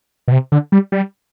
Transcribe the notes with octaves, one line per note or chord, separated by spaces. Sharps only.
B2
C3
D3
G3
G3